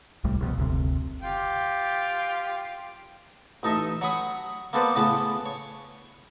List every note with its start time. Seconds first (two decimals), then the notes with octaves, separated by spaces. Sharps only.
0.24 D1 C2 A2 G3
0.41 C2 F2 B2
0.57 F#1 D2 C3
1.22 F4 G4 G5
3.63 A1 D#4 A4 D#5 E5
4.01 F#3 C#5 F#5 B5 D#6
4.73 A#3 B3 A4 B4 C5 D5
4.96 A2 C#3 B3 B4 A5
5.46 C#5